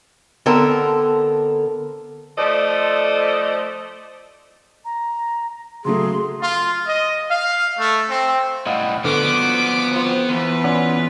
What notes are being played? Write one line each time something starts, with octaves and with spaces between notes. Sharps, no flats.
D3 B3 C4 A4 A#4
F3 A3 A4 C5 D5 D#5
A#5
C#3 F#3 A3 G#4 C6
F4
D#5
F5
A3
C4
A2 G3 D#5 F5 F#5
D3 F3 B3 F#4 D6
C4 F4
E2 F4 B4
C#4 D5 F#5